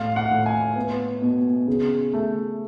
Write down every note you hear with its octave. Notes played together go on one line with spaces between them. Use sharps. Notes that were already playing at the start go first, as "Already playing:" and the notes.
Already playing: A2 F5
F#5
A2
G#5
B3
B2
C#3
A3